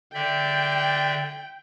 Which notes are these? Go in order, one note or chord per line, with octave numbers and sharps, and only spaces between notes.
D3 D5 E5 G5